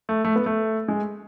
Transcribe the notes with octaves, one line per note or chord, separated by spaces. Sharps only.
A3
A3
B3
A3
G#3